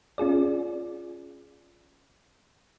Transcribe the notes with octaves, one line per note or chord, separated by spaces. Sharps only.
C#4 F4 G#4 D5